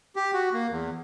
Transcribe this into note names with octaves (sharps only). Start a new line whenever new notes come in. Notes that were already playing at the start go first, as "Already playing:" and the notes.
G4
F#4
A#3
E2